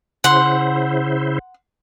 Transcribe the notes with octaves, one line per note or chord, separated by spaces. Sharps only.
C#3 E4 C5 F#5 C6